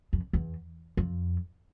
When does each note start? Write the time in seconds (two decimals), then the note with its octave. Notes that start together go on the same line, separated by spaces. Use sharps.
0.13 F2
0.33 E2
0.97 F2